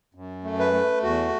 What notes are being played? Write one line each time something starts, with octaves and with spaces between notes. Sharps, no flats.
F#2
A3
B4
A3
E2 F#4